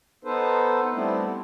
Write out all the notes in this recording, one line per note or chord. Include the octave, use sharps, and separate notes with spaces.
B3 D#4 A4 B4 C5
G3 A3 B3 C4 D4 E4